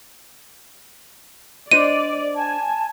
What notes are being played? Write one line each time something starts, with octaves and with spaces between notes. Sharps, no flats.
D4 C5 D5 D#5 D#7
G#5 A5